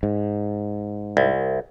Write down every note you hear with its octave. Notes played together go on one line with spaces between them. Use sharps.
G#2
C2